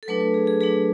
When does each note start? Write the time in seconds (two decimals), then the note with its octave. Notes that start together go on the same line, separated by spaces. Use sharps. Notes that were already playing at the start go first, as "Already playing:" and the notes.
0.03 A4
0.08 F#3 A3 D4 B4
0.21 A4
0.34 G#4
0.47 G#4
0.61 F#3 A3 D4 G#4